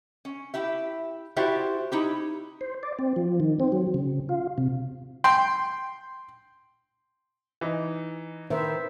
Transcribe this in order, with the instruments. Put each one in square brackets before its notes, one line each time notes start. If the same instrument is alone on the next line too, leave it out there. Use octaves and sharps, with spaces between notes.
[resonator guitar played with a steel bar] C#4
E4 G4 E5
E4 F#4 G4 C5 D5 E5
D#4 E4 G4
[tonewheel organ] C5
D5
C4
F3
D#3
C4
F#3
C#3
F4
C3
[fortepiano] G5 C6
[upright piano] E3 D#4
[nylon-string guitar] D#3 [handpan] B4 C5 E5